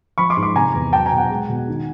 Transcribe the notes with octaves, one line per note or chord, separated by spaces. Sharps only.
F3 B5 C#6
C6 D6
G#2
C6 D6
C3 G#5 A#5
E2
F#3 G5 A5
G#5 A#5
B2
F#5 G#5
G#3
B2
D#3